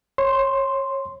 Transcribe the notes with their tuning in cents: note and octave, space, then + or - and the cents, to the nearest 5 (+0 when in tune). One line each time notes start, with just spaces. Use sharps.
C#5 -20 C6 +0